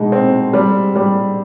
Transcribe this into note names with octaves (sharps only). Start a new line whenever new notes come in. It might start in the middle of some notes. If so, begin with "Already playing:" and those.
Already playing: B2 G#3 D#4
C4
G3
G3